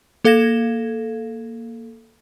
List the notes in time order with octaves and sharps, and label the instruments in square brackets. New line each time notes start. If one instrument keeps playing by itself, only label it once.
[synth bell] A#3 A4 F5 G#6 A#6 E7